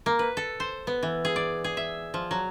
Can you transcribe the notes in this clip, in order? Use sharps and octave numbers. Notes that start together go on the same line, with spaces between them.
A#3
B4
A4
C5
B3
E3
G#4
D5
G#4
E5
F3
F#3